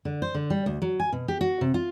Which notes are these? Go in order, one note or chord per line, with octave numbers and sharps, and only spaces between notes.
D3
C5
D3
G3
D2
F#3
G#5
B2
G4
F#4
C3
F4